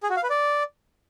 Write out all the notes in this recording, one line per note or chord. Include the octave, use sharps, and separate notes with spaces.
G#4
F#4
F5
B4
D5